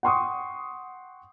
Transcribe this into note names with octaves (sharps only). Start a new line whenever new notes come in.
F#5 G5 C6 C#6 D#6